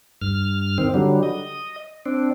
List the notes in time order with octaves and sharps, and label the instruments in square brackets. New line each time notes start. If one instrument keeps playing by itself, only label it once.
[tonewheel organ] G2 F6
D#3 C4
D3 F#3 G3
D#5
C4 D4